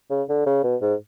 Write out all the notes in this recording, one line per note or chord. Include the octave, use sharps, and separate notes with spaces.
C#3
D3
C#3
B2
G#2